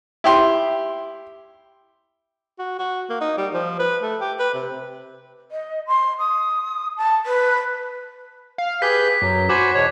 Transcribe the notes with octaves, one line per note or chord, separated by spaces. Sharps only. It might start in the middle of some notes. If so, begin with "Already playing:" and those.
E4 G4 C6
F#4
F#4
A#3
D#4
G3
F3
B4
A3
G4
B4
C3
D#5
C6
D#6
A5
B4
F5
G4 G#4 B4 G6 B6
F#2 F#3
F#4 C5 G#5 B5 D6
E2 B2 C#5